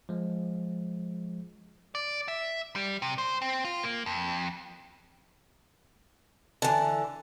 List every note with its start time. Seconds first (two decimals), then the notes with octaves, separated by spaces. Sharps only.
0.09 F3 G#3
1.95 D5
2.28 E5
2.75 G3
3.02 C3
3.18 C5
3.42 C4
3.65 F4
3.83 A#3
4.06 F2
6.62 D3 E3 A5